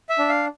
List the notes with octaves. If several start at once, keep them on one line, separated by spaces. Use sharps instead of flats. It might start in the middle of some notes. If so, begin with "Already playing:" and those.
E5
D4
F5